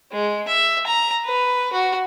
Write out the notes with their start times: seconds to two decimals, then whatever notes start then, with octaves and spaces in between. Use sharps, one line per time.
0.12 G#3
0.48 E5
0.87 A#5
1.26 B4
1.73 F#4